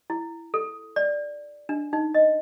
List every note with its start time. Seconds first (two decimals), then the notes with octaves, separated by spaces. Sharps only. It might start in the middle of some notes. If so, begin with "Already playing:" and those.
0.10 E4
0.54 A4
0.96 D5
1.69 D4
1.93 D#4
2.14 D#5